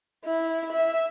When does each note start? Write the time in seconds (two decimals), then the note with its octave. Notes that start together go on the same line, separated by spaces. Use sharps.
0.25 E4
0.72 E5